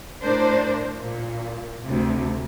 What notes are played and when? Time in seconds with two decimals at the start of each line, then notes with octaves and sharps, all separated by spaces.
0.22 A2 D4 A#4 C5
0.98 A#2
1.84 D2 C3